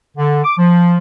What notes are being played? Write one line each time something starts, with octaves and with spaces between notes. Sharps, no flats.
D3
D6
F3